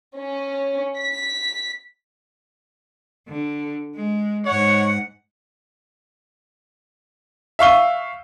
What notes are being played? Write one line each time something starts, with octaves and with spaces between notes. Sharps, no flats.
C#4
B6
D3
G#3
G#2 C#5 F#5
E5 F5 C#6 G7